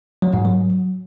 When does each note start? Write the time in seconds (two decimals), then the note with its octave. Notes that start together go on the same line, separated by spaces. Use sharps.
0.22 F#3
0.34 G#2
0.45 F#3